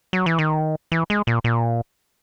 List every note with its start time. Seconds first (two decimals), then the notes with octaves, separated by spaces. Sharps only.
0.13 F#3
0.26 E3
0.39 D#3
0.92 E3
1.10 G#3
1.27 A#2
1.44 A#2